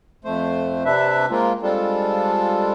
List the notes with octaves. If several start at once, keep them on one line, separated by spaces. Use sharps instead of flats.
F2 A3 C5
C3 D4 B4 E5
G#3 A#3 C4 F4
G3 G#3 C4 D4 F4 A4